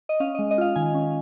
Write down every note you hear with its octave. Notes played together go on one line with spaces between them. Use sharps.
D#5
C#4 F5
G#3 D#5
D#5
F4 F5
D#3 G#5
C#4